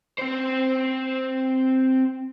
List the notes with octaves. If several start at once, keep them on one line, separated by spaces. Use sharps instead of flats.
C4 C5